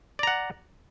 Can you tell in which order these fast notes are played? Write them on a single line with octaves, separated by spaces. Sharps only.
D5 A#5 F#5